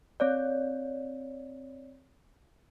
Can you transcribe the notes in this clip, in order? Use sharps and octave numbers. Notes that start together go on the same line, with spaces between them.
C4 C#5 D5